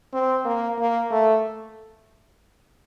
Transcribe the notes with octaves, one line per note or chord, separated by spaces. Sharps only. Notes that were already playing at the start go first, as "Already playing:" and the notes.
C4
A#3
A#3
A3